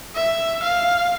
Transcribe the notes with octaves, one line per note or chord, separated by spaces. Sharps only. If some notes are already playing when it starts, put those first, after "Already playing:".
E5
F5